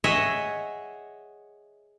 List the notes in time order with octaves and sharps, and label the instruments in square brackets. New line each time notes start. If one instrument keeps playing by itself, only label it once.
[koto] G#4 C#5 D#5 E5 F#5